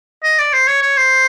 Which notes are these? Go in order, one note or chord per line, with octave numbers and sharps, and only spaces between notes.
D#5
D5
C5
C#5
C#5
C5